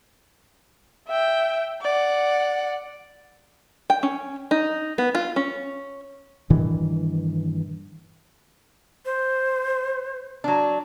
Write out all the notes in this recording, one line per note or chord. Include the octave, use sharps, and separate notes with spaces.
E5 G5
D5 F#5
G5
C#4
D#4
B3
F4
C#4
G2 A#2 D#3 E3
C5
F#3 D4